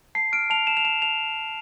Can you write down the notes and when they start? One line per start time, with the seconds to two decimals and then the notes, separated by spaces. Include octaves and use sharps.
0.15 A5 C7
0.33 F6 D7
0.50 A5 F7
0.67 A5 E7
0.77 F7
0.85 A5 E7
1.02 A5 F7